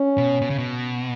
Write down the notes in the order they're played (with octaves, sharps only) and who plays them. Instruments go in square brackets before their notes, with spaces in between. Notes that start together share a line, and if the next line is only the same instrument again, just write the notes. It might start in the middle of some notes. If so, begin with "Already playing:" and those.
Already playing: [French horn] C#4
[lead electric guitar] B2
B2
C#3
B2